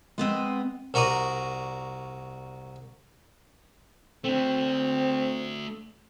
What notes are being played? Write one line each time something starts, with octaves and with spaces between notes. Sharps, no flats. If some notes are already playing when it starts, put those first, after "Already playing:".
G#3 B3 C4 D#5
C2 F#4 A#4 D5 D#6
A3 C4 D4